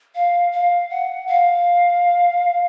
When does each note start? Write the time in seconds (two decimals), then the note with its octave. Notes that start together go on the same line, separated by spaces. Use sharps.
0.15 F5
0.52 F5
0.90 F#5
1.27 F5